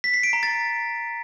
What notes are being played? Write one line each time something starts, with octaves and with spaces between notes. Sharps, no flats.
B6
C7
D7
A#5
A6